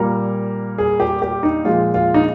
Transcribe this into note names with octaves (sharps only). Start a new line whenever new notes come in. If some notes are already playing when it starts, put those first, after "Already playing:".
Already playing: A#2 G3 A#3 A#4
G#4
G4
G4
D#4
A#2 F3 G#3 F4
F4
D#4